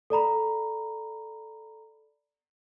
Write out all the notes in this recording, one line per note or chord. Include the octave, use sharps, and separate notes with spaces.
A4 D5 A#5 B5